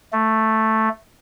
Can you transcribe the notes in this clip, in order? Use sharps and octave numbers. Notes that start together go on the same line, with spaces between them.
A3